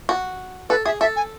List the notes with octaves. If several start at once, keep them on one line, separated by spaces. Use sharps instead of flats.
F#4
A4 B4
G#4 E5
A4 E5
G#5